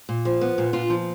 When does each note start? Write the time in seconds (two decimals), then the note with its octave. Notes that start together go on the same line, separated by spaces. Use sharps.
0.09 A#2
0.25 F3
0.41 B3
0.58 A#2
0.73 A#2 D4 F4
0.90 F3